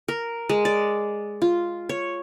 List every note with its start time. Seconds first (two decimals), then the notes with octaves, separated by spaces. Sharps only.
0.08 A#4
0.49 G#3
0.65 D5
1.42 F4
1.89 C#5